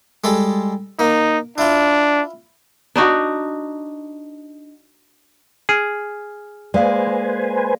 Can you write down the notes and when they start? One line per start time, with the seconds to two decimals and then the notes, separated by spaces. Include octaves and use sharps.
0.24 G3 G#3 A4
0.99 A#3 D#4
1.58 D4 E4 F4
2.96 D4 D#4 F#4
5.69 G#4 G#5 F6
6.74 G#3 A#3 B4 C5 D5 F5 G#5